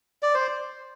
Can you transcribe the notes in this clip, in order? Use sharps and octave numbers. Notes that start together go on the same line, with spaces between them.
D5
C5